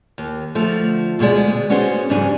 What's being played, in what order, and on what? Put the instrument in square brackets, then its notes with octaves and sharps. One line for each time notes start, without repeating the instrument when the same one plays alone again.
[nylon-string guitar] D#2
D3 F3 A3
D2 B2 E3 G#3 D5
B3 C#4 D4 F#4 G#4 C5
F2 G#2 C#3 G3 D4 G#5